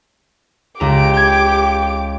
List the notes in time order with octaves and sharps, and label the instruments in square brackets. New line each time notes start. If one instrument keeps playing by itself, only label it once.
[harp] C#2 A#5 [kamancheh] G4 D6
[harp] G5 G#6